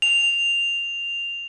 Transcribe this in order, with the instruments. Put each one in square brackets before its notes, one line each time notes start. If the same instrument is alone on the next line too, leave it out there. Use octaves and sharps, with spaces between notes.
[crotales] F7